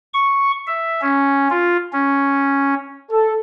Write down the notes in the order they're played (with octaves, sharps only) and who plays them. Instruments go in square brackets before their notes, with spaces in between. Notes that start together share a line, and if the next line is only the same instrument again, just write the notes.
[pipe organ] C#6
E5
C#4
F4
C#4
[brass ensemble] A4